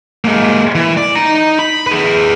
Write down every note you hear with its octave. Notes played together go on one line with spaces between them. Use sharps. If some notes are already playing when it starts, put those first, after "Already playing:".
G#3 A#3
E3
D5
D#4 A#5
B5
G#4 B4